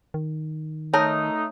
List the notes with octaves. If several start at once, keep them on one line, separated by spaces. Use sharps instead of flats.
D#3
A3 D#4 A#4 C#5 A5